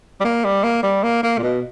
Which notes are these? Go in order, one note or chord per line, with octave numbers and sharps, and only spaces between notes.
G3
A#3
G3
A#3
G3
A#3
A#3
A#2
B2